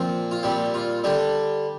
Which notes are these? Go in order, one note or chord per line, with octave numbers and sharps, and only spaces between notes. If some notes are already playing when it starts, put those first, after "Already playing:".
Already playing: A#2 F3 C4
F4
A#2 G3 C4 G4
F4
D3 G3 D4 G4